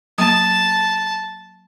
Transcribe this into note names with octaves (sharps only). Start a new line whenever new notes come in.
F#3 A#3 A5